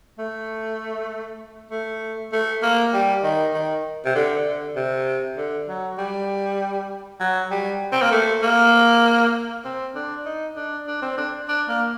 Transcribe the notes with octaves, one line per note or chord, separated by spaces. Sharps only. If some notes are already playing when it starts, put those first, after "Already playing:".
A3
A3
A3
A#3
G3
D#3
D#3
C3
D3
D3
C3
D3
F#3
G3
F#3
G3
C4
A#3
A3
A#3
C4
D4
D#4
D4
D4
C4
D4
D4
A#3